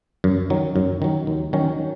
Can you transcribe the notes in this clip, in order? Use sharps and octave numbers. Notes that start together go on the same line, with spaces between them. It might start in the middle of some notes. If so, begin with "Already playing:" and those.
F#2
D#3 F#3
F#2
D#3 F#3
D#2
D#3 F#3 C#4